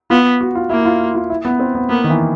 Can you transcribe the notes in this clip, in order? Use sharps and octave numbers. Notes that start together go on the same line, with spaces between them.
B3 F4
F#4
F4
A#3 E4
F4
F4
E4
B3
C4
B3
A#3 B3
D#3
E3